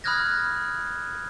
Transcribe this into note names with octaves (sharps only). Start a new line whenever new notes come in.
B5 D#6 F6 F#6 G#6 A#6